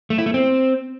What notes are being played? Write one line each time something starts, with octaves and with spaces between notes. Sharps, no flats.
A3
E4
A3
C4